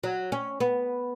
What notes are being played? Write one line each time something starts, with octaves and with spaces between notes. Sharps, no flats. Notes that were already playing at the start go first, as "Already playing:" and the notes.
F#3
C#4
B3